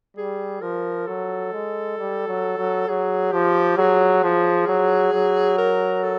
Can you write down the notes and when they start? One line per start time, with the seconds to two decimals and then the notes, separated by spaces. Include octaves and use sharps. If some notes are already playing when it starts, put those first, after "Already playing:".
0.17 G3 G#4
0.62 F3 A#4
1.07 F#3 A4
1.53 G#3
1.98 G3
2.28 F#3
2.58 F#3
2.88 F#3 G#4
3.32 F3 G4
3.77 F#3 G#4
4.24 F3
4.68 F#3
5.13 F#3
5.58 A#4
6.03 A4